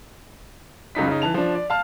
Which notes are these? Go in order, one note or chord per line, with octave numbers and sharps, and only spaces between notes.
C#2 F#2 D#4 B6
C#3 D#4
E3 A5 F7
F3 D4
D5
F5 A5 F6